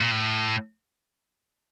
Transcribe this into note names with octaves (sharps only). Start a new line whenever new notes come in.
A#2
A2